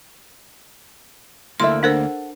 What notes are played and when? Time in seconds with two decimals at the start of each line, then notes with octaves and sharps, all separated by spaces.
1.60 D2 A#3 E4 A4 E5 C6
1.83 D4 A4 A#4 C5 F#5